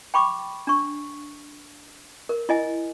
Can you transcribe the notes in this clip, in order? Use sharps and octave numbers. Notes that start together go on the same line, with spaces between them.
G5 B5 C#6 D6
D4 C#6
A#4
E4 D#5 G#5